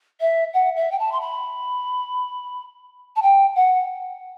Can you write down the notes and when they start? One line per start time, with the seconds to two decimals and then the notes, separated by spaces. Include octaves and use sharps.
0.21 E5
0.54 F#5
0.76 E5
0.91 G5
0.99 A5
1.12 C6
1.21 B5
3.16 A5
3.22 G5
3.56 F#5